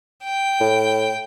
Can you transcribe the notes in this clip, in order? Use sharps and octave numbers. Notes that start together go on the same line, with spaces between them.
G5
A2